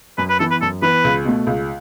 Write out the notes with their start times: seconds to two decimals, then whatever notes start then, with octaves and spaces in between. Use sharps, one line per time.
0.18 F#2 B4
0.30 B4
0.39 E3 B3 A4
0.51 B4
0.61 F#2 A4
0.82 E3 B3 B4
1.04 C#2
1.25 B2 A3
1.47 C#2